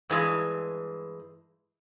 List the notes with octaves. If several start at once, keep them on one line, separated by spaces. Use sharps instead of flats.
G2 E3 G#3